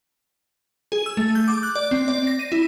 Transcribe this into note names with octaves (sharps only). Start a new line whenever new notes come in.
G#4
E6
A3
G6
D6
F#6
D5
C4
D5
A#6
D#7
E4